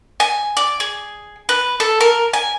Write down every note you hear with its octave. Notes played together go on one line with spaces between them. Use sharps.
G#5
D5
G#4
B4
A4
A#4
G#5